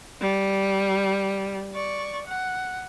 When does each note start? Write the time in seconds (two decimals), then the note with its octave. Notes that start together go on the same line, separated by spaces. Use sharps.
0.21 G3
1.73 D5 C#6
2.27 F#5